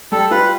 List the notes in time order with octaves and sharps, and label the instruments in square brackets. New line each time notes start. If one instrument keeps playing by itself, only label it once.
[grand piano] G3 [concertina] A4
[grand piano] F4 [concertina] B4